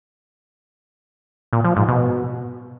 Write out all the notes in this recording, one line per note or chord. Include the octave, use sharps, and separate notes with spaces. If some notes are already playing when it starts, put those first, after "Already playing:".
A#2
F3
G#2
B2